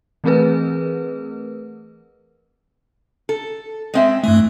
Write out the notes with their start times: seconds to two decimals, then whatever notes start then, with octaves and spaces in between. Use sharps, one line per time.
0.24 E3 A3 C4 G#4 A#4 B4
3.29 A4
3.94 G#3 C4 E5
4.24 G2 E3 A3